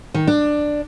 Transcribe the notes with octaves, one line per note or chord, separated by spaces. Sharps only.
D#3
D4